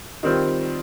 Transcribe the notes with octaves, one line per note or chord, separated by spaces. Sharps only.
D#3 G3 C4 F4